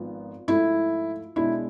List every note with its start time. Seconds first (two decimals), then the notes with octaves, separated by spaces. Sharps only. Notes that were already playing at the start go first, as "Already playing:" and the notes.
Already playing: G#1 G#2 F3 B3
0.47 G#2 F3 A3 E4
1.36 B1 B2 G#3 D4 E4